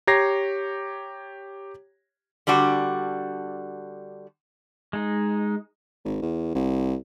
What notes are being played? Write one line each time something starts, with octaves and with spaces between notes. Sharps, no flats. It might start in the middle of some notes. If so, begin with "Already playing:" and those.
G4 C#5 A#5 G#6 A#6 C7
D3 G3 D4 F#4
G#3 D#4
G#1
E2
C2